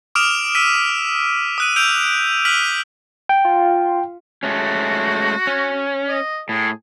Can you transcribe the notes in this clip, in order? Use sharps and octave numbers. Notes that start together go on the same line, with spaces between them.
D6 D#6 F6 D7 E7 F7
E6 B6 D#7
D#6 F#6 D#7
E6 G6 D7 F7
F6 B6 D#7 F#7
G5
F4
G#3 A3 C#4 F#4
C#4
D#5
A2 G#4